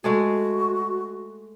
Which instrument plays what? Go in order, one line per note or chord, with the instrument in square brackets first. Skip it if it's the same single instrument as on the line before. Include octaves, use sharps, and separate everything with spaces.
[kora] G#3 A3 G#4 [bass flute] F#4